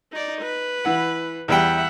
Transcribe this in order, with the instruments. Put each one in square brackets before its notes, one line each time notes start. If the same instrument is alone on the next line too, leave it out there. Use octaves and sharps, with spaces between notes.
[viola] D#4 D5
B4
[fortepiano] E3 F#5
[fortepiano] E2 G3 G5 [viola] E5 F#5